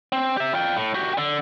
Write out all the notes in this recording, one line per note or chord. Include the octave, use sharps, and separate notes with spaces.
C4
G4 E5
F4 G5
A2
F#4 G4
D3